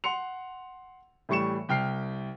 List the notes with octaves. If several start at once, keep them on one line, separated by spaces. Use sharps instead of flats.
F#5 C6 C#7 F7
A2 E3 G3 C#6 C#7 E7
C2 G5 F6 C7